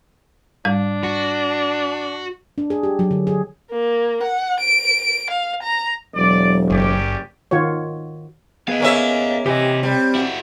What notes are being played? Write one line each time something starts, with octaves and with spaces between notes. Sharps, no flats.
G#2 G3 D4 F5
F#4
D4
G#4
G4
F#3
D3
G#4
A#3
F#5
D7
F5
A#5
E1 F#3 D5
F#1 C#4 G4 D5
D#3 F4 F#4 C#5
B3 G#4 B4 D#5 F5
A#3 C#4 E5
C3 E3 G4 D#5
G3 C4
E4 F#4